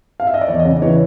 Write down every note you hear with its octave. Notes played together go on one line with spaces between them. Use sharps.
F5
E5
D#5
D5
E2 C#5
D#5
C#3 D5
E3 C#5